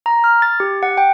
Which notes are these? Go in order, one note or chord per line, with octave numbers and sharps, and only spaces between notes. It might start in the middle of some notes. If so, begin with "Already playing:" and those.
A#5
F6
A6
G4
F#5
G5